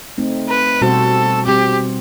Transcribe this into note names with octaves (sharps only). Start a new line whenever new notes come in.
A3 C4 D#4
B4
B2 G3 C4 F#4 A4 C5
G3 C4 F#4 G4